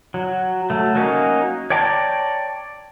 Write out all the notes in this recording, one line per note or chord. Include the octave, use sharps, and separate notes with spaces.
F#3
F#3 A3
F#3 A#3 C#4 D#4
C#5 D5 G5 A5 A#5